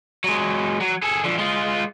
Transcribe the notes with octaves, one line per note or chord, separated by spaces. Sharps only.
F#3 G#3
F#3
G#4 A4
D3 F3
G#3 F4